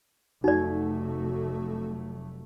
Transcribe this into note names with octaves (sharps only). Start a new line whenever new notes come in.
F1 F#3 A3 D#4 F#4 D5